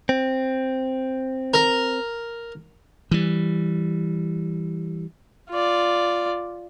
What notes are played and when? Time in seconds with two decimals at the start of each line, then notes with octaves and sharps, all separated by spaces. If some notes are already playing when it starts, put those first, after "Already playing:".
0.09 C4
1.54 A#4
3.11 E3 G3
5.50 F4 D5